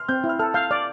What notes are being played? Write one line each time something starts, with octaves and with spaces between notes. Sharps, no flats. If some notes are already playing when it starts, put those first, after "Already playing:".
Already playing: C6 F6
C4 G6
E4
F6
A4 F6
F5 G6
D5 F6